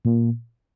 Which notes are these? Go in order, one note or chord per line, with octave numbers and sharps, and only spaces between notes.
A#2